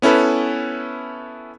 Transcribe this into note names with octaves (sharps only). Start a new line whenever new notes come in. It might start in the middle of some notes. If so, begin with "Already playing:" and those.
B3 C#4 E4 A4 B4